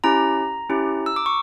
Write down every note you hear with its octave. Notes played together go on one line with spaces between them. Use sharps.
C#4 E4 G4 A#5
C#4 E4 G4
E6
D6
C#6